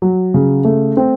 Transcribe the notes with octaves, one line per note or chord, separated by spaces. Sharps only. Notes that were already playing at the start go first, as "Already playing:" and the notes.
F#3
C#3
A3
C4